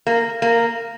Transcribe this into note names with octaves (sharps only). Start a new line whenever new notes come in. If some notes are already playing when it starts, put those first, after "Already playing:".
A#3
A#3